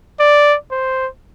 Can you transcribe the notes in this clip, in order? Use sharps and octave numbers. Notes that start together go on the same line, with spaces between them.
D5
C5